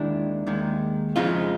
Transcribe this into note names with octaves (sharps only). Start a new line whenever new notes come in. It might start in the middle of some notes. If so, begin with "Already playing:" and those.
Already playing: D#2 D#3 G#3 D4 E4
D#2 D#3 G#3
F2 C#3 F3 G#3 D#4 F4